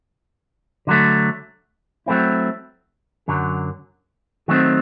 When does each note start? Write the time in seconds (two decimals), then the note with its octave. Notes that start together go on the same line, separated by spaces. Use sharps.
0.87 D3 F#3 A3
2.06 F#3 A3 C4 E4
3.28 F#2 D3 F#3
4.48 D#3 F#3 A3 C4